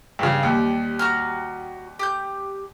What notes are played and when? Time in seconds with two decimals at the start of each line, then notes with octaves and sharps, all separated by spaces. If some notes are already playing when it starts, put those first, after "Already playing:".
0.19 G2 C#3
0.43 D#2 G3
0.99 F#4 A#5 F6
1.99 G4 G6